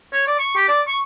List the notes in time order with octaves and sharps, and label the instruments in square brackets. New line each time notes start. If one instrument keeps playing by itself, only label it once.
[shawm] C#5
D5
C#6
G4
D5
C#6